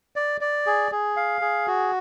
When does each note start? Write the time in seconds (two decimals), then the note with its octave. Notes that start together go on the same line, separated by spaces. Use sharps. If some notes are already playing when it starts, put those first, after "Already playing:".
0.16 D5
0.41 D5
0.66 G#4
0.92 G#4
1.17 F5
1.41 G#4
1.67 F#4